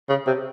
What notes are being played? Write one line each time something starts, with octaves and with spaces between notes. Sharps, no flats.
C#3
C3